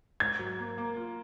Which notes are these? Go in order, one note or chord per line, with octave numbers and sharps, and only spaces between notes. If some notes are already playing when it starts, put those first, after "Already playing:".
G#2 G#6
F#3
A#3
A#3
F4